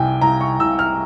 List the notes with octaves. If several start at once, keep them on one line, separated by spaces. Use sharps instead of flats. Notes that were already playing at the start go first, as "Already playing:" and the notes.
Already playing: C2 C3 G5 G#5
C2 A#5
C#6
C2 E6
F6